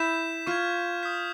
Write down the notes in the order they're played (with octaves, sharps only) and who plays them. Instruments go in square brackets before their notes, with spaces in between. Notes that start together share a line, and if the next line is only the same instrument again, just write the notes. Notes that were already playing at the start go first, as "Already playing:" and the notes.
Already playing: [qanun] E4 [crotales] G6 B6 E7
[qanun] F4 [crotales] C#6 F6 G#6
[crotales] D#6 G6 B6